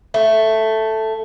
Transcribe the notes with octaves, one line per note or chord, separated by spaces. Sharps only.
A3